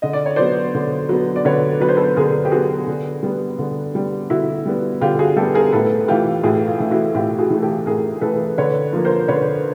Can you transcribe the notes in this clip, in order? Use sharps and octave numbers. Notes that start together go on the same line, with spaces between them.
D3 D#5
D5
C#5
F#3 B3 C5 D5
D3
F#3 B3
D5
D3 B4 C#5
F#3 B3 B4
C5
A4 B4
D3 G#4 A#4
G4
F#3 B3 F#4 G#4
D3
G3 B3
D3
G3 B3
D3 E4 F#4
G3 B3
D3 F4 G4
F#4 G#4
G3 B3 G4 A4
G#4 A#4
A2 A4 B4
E3 A3 F4 G4
A2 F#4 G#4
F4
E3 A3
E4 F#4
A2 F4 G4
F#4 G#4
E3 A3
G4 A4
A2 G#4 A#4
E3 A3 A4 B4
D3 B4 C#5
F3 A#3
A#4 C5
D3 B4 C#5